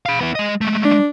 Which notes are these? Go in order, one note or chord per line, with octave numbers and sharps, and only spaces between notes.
F5 B5
B3 E4
G#3 D#5
G#3 A3
D4